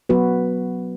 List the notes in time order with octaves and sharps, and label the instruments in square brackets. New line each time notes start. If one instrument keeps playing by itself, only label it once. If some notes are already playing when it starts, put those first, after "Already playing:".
[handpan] F#3 B3 F#4 B4